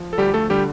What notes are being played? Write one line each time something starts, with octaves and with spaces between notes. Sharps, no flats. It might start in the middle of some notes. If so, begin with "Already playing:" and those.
Already playing: F3
A4
D2 G3 G4
A3 A4
D3 G3 G4